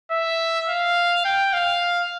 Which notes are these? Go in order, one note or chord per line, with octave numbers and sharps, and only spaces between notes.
E5
F5
G5
F5